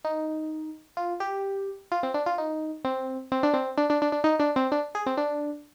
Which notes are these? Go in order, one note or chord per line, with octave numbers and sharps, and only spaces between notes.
D#4
F4
G4
F4
C4
D4
F4
D#4
C4
C4
D4
C4
D4
D4
D4
D4
D#4
D4
C4
D4
G#4
C4
D4